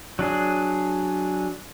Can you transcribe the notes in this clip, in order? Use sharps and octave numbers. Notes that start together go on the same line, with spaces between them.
F#3 D4 G#4